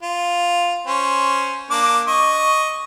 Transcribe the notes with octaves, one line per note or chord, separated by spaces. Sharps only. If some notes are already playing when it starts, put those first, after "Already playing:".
F4
C#4 C5
A#3 D4 D6
D#5 C#6